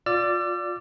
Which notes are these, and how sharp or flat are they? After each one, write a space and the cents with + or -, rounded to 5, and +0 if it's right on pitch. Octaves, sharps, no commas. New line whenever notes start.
F4 +25 D5 +0 E6 +45